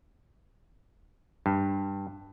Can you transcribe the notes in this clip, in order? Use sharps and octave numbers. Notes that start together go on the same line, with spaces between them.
G2